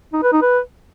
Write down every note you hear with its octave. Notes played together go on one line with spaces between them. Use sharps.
D#4
B4
D#4
B4